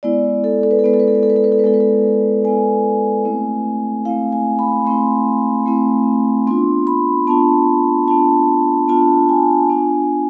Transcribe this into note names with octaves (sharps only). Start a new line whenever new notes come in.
G#3 B3 E4 D5
A4
A4
B4
A4
G#3 B3 E4 B4
A4
B4
A4
B4
A4
B4
A4
B4
A4
B4
G#3 B3 E4 A4
B4
A4
G#3 B3 E4 G#5
A3 C4 E4
A3 C4 E4 F5
G#5
B5
A3 C4 E4 C6
A3 C4 E4
B3 D4 F4 C6
B5
B3 D4 F4 A5
B3 D4 F4 A5
B3 D4 F4 A5
G#5
B3 D4 F4